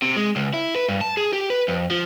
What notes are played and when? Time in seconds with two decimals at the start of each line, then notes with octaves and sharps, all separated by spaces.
0.02 C3
0.16 G#3
0.36 C#2
0.54 E4
0.76 B4
0.89 G2
1.01 A5
1.17 G#4
1.33 G4
1.50 B4
1.68 F2
1.91 F3